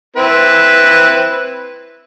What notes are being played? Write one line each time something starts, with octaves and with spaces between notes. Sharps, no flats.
C4 E4 B4